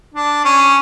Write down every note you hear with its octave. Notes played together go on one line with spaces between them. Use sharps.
D4
C#4